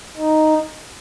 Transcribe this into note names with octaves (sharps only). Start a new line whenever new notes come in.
D#4